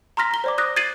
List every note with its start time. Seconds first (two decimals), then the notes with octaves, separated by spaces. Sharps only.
0.17 A#5 C6 F6 A#6 B6
0.31 A#5 G7
0.44 C5 D5 D6
0.58 D#6 F#6 A#6
0.76 G#6 A6 C7 D#7 F#7